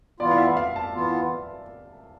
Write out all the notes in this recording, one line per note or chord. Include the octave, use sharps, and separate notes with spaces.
E3 B3 F4 D5
F5
E5
F5
A5
E3 B3 F4